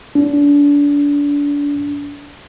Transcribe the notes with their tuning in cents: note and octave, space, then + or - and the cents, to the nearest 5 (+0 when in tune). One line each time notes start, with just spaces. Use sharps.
D4 -30